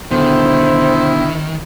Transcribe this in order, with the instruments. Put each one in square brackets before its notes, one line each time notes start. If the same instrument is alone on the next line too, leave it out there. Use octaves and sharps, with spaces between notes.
[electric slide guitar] B2 D3 [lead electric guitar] D#3 [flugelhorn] E4 [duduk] C5